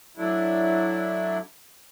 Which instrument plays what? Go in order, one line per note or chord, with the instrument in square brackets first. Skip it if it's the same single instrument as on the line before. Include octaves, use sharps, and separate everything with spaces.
[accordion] F#3 A3 D4 E4